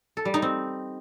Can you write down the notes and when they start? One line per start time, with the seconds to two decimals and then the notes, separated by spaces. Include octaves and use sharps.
0.17 A4
0.25 G3
0.34 D#4
0.42 C4